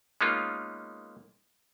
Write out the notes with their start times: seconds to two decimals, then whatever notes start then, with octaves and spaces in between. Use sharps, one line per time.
0.21 G#3 A#3 B3 C#4 D#4 F4